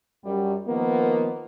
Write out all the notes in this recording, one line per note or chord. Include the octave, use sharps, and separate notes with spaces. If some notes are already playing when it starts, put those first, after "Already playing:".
F#2 G3
D#3 F3 A#3 B3